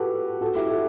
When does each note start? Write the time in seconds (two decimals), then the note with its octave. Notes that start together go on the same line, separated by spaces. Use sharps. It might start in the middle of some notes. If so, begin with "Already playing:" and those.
Already playing: F#4 G4 A4 B4
0.41 F#4 A4
0.55 E4 G4
0.70 F#4 A4